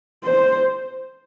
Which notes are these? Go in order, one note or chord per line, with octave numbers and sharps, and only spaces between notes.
C5